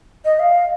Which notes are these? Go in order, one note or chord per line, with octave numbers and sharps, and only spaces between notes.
D#5
F5